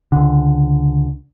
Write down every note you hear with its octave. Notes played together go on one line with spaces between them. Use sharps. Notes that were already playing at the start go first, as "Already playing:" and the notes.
C#2 D3